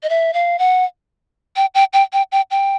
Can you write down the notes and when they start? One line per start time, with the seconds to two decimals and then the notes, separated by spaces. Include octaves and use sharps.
0.03 D#5
0.10 E5
0.34 F5
0.59 F#5
1.56 G5
1.75 G5
1.93 G5
2.13 G5
2.32 G5
2.51 G5